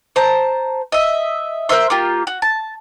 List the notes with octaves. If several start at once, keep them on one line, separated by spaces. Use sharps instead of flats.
C5 A5 A#5
D#5 E5
A#4 C5 E5 C6
A#3 F4 G4
F#4
A5